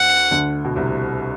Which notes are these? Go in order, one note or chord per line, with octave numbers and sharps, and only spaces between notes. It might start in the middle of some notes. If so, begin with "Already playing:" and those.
Already playing: D2 F#5
D2 D3
B2
C2 C3